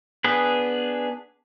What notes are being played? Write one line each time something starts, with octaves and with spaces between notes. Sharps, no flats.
B3 D4 G#4 B4